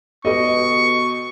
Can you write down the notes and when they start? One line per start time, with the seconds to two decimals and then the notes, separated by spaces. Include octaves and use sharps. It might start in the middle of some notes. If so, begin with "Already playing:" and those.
0.25 B2 G4 A4 B4 D#5 C#6